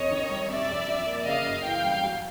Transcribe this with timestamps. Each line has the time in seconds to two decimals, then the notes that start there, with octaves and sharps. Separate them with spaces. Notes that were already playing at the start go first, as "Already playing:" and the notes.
Already playing: F2 C3 C#5 D#5
0.11 D#3
0.30 G3
0.50 C3 D5 E5
0.69 F2
0.88 F3
1.06 A#3
1.26 C#3 D#5 F5
1.46 F#2
1.64 E3 F5 G5
1.84 G3
2.03 F#3